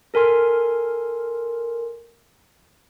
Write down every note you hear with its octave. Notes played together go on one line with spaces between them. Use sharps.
A4 A#4 G#5 C6 F6